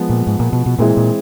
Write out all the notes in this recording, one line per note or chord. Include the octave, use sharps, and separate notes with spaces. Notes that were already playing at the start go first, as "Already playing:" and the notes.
Already playing: F3 G#3 B3
A#2
G#2
A#2
B2
B2
A#2 E3 G#3 C4 E4 G#4
A#2